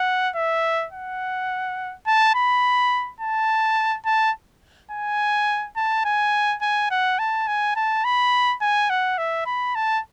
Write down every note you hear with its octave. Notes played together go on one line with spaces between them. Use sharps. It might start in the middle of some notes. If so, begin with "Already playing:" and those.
Already playing: F#5
E5
F#5
A5
B5
A5
A5
G#5
A5
G#5
G#5
F#5
A5
G#5
A5
B5
G#5
F#5
E5
B5
A5